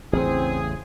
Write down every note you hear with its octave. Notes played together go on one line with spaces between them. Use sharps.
A1 E2 C#3 C4 G#4